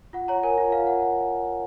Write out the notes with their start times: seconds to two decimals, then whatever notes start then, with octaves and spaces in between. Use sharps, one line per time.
0.13 F4 F#5
0.28 C#5 A#5
0.43 A#4 G#5
0.58 F4
0.72 F4 F5
0.87 F#5